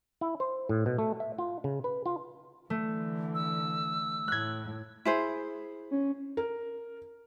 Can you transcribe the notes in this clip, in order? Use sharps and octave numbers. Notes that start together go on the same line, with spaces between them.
E4
C5
A2
B2
A3
E5
F4
C#3
B4
F4
D3 E3 A3
E6
A2 F#6 G#6
E4 G#4 C5
C#4
A#4